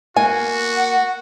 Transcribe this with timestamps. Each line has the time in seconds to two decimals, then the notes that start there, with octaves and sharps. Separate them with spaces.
0.16 A#3 F#4 G#5
0.76 F#5